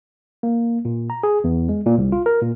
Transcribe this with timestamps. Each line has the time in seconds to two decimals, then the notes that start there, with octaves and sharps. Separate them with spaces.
0.43 A#3
0.85 A#2
1.10 A#5
1.23 G#4
1.44 E2
1.69 G#3
1.86 A#2
1.98 C2
2.12 F4
2.26 A#4
2.42 A#2